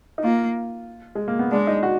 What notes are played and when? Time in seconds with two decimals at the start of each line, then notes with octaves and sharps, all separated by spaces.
0.18 D#4
0.24 A#3 F4
1.15 G#3
1.28 A#3
1.39 B3
1.51 G#3 D4
1.67 D#4
1.83 F#4